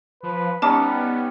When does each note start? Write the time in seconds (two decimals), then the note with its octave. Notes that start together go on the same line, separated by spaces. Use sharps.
0.23 F3 B4
0.62 G3 B3 C#4 D#4 F#5 A5 D6